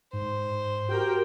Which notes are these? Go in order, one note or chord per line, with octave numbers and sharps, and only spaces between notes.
G#2 C5
F#4 G4 A#4 G5